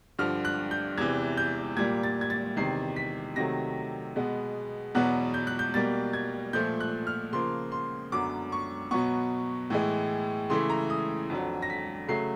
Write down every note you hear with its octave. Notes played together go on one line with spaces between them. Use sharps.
G2 D3 F3 F6
F#6
G6
E2 C3 E3 G#6
G6
A#2 G3 A#3 G#6
A6
G#6
A6
E2 C3 D#3 C7
B6
C3 D#3 F#3 A3 A#6
B2 G#3 B3
E2 B2 F#3 B3 F#6
G6
F#6
G6
B2 G3 A#3 A6
G#6
A#2 F3 A3 G6
F#6
F6
C#3 F3 A#3 C6
C6
F#2 D3 F#3 B3 D6
C#6
B2 F#3 B3 C#6
A2 E3 G#3
C#3 E3 A3 C6
A#5
D#6
F2 D3 F#3
A#6
B6
C#3 F#3 A3 C7